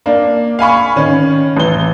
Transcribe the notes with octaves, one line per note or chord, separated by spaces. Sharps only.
A#3 D4
F5 G#5 B5 C#6
D#3 C#4
A1 G7